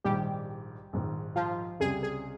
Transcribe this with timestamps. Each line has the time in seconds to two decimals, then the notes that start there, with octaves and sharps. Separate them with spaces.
0.05 A#1 G#2 D#3 G3 G4
0.93 A#1 G#2 D#3
1.36 F3 F4
1.80 C#2 C3 G3 G#4
2.03 G#4